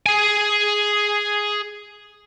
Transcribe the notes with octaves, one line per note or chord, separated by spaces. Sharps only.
G#4 G#5